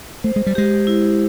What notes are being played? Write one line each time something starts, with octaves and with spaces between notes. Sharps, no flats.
A3 C5
G#3
G3
G#3 G4
E4